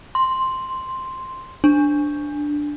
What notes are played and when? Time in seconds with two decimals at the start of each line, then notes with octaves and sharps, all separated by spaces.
0.15 C6
1.64 D4